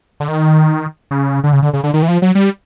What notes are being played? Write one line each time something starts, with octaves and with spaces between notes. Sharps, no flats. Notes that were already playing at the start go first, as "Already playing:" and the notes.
D3
D#3
C#3
D3
C#3
D3
C#3
D3
D#3
E3
F3
F#3
G3